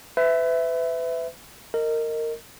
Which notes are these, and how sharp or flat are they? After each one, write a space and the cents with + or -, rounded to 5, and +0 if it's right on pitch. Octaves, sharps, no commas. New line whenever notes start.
B4 +35 E5 +0
A#4 -20 D#5 +0